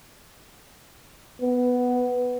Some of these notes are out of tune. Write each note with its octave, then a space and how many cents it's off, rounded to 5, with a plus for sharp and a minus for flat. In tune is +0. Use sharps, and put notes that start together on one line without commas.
B3 +5